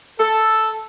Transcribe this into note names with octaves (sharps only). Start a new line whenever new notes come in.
A4